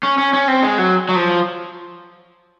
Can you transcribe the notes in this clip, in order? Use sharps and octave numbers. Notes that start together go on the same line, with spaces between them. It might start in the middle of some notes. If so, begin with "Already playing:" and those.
C#4
C#4
C#4
C4
G#3
F#3
F#3
F3